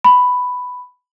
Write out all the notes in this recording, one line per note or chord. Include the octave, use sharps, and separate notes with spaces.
B5